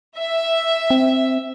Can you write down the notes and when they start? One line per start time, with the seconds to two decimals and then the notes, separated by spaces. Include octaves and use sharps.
0.19 E5
0.90 C4